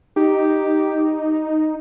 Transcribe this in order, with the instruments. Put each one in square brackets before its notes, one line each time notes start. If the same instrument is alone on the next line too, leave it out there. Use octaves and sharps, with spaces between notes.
[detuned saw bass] D#4 [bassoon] G4